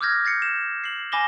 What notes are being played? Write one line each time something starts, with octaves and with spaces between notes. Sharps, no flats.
D6 E6 F6 G6 G#6 A#6
G6 A6 C7 C#7
E7
C7 F#7
G#5 B5 D6 A#6 E7 G7